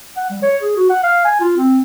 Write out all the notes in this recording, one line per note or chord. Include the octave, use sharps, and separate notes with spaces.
F#5
G3
C#5
G#4
F#4
F#5
F5
G#5
F4
C4